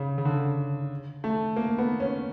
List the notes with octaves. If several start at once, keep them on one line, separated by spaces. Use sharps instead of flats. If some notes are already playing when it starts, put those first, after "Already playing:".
Already playing: C#3
C#3
D3
A3
A#3
B3
C#4